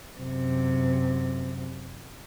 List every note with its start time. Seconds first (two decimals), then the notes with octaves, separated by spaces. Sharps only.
0.18 F#2 C3